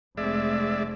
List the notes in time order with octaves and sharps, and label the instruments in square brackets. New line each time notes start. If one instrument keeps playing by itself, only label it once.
[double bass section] F1 A3 C4 [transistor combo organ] G#3 D5 E5